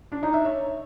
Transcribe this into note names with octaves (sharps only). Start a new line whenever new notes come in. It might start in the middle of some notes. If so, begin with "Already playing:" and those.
D4
D#4
E5
C#5